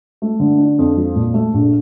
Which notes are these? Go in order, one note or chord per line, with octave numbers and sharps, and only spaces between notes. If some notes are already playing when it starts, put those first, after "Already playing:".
A3
D3
D4
F2
F3
A#2
A3
A#1